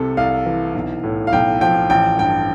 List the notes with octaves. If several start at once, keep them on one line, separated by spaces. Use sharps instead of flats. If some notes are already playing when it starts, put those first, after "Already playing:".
Already playing: C2 C3 A4
C2 F5
E3
B1
A2
F5
B1 G5
F3 G5
A1 G5
G2 G5